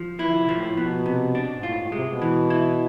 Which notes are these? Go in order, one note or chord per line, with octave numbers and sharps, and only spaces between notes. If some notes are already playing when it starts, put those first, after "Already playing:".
Already playing: F3
E3 E4
D3
C3
B2
A2 F3
B2 B3
C3
D4
G#2
A2 F4
G#2
A2
C3 G#3
B2
E3
E4